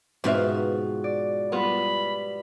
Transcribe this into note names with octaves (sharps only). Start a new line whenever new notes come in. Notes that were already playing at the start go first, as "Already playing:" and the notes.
G#2 B2 F3 G#3 C4 F#4 E5 F5
D5
G3 B3 F4 B5